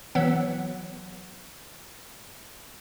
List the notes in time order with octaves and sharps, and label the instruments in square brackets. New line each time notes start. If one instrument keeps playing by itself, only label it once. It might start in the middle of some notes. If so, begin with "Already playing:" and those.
[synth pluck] E3 F#3 B3